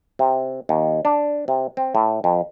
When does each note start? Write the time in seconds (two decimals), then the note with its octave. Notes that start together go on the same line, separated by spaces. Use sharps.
0.19 C3
0.69 D#2
1.05 D4
1.48 C3
1.77 C4
1.95 A2
2.24 F2